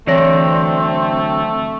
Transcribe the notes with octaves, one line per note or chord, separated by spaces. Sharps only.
D3 E3 F#3 A3 C4 C#5 D5 A#6